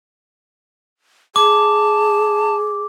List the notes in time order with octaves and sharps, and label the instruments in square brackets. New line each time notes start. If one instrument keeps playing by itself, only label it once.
[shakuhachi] G#4 [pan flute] A5 [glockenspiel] D6